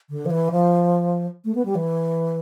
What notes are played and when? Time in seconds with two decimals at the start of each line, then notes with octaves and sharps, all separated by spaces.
0.10 D3
0.26 F3
0.30 E3
0.51 F3
1.45 A3
1.55 B3
1.65 G3
1.75 E3